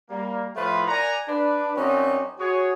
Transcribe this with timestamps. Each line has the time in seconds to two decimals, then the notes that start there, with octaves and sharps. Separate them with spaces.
0.10 G3 A#3
0.56 A2 F3 A3 E4 F4 B4
0.87 A#4 D5 F#5 G#5 A#5
1.28 D4 B4
1.76 F#2 C4 C#4 D#4 F#4 D5
2.39 F#4 G#4 C#5